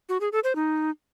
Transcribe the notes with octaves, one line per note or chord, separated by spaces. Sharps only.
F#4
G#4
A4
C5
D#4